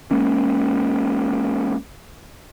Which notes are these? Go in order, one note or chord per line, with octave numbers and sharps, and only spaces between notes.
G#3 A#3 C#4